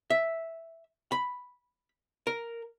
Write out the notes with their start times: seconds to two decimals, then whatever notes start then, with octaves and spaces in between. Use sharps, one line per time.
0.10 E5
1.12 B5
2.27 A#4